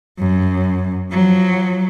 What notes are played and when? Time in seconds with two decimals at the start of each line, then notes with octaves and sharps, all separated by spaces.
0.19 F#2
1.12 F3 F#3